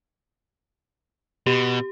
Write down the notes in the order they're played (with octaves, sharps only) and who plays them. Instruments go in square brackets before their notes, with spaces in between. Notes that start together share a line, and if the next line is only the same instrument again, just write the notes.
[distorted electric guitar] B2 [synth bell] G4